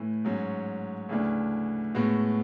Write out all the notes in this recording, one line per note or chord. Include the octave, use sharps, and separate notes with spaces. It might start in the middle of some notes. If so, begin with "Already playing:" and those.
Already playing: A2 E3 A3
G#2 F#3 C#4
D2 C#3 E3 A3 D4
A2 G#3 B3 F#4